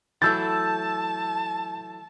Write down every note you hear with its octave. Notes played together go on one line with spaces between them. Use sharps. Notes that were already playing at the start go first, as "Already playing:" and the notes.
E3 F#3 A3 A5 E6 G6 A6